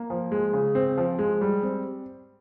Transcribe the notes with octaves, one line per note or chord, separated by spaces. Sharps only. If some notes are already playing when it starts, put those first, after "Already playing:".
Already playing: A#3
F3
G#3
C#3
C4
F3
G#3
G3
C4